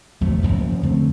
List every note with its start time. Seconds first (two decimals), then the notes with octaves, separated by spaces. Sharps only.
0.21 G1 F2 F#3 A3
0.41 F#1 B1 F#2 F3
0.83 F2 D3 A3 C4